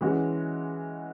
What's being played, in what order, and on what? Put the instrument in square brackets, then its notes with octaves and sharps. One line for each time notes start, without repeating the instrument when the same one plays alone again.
[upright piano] E3 G#3 C#4 F#4